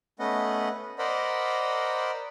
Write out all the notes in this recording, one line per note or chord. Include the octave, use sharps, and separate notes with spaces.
A3 B3 C#4 B4 D#5 F#5
A#4 C5 D5 D#5 F#5 B5